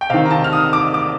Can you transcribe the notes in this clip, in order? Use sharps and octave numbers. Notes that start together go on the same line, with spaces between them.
G5
C3 D#3 F5
A#5
A5
F6
D#6
D6
D6